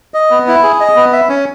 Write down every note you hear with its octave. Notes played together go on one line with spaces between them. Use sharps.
D#5
B3
E4
G#4
D#5
B3
E5
C#4